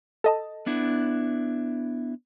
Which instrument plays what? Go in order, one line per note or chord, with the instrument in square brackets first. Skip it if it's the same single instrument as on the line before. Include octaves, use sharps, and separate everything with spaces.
[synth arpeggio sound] A4 D#5 A5
[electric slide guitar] B3 D4 E4